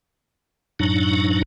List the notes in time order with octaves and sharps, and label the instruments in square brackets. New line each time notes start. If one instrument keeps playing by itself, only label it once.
[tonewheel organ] F#2 A2 F#3 D4 D#4